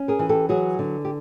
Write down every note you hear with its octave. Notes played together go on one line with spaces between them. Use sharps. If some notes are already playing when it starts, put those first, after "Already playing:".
Already playing: C#4
G#4 A#4
E3
G4 A4
F#3 F#4 G#4
D3
G4